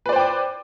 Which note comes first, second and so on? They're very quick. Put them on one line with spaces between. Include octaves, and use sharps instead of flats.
B4 D5 C5 G5 D6